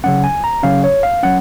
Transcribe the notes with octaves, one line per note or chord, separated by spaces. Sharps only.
C#3 F#3 C#4 F#5
G#5
A#5
C#3 F#3 C#4 F5
C#5
F5
F#3 C#4 F#5